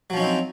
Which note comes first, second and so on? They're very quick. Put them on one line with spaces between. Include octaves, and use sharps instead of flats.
F#3 F3 C#4 D#4 C4